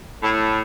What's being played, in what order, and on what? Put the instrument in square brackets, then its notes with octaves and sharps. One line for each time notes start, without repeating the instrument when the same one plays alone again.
[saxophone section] A2